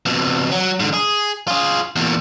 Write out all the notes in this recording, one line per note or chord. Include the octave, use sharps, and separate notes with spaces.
F2 B2
F#3
G#2 D3
G#4
F4 G#4
E2 A#2